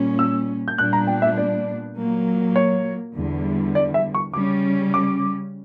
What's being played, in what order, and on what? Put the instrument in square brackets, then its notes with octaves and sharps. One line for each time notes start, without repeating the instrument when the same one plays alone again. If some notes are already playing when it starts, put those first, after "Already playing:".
Already playing: [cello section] A#2 G3 C#4
[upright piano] E6
G6
[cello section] A#2 G3 B3 D4 [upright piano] F#6
[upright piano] A#5
G5
E5
D5
[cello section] A#2 F#3 A#3
[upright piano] C#5
[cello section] E2 D3 G3
[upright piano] D5
E5
C#6
[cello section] C#3 G3 C#4 [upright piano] D6
[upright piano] D6